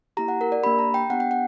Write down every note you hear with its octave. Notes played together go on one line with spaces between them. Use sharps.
A#3 E4 G4 A#5
F#5
A#4
D5
A#3 D4 G4 B5
A#5
G5
B3 D4 G4 F#5
G5
F#5